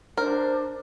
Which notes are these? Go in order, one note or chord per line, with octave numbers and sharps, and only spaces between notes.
D4 A#4 C5